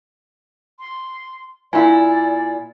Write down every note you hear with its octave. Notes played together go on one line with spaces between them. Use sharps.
C6
A#2 E4 D5 G#5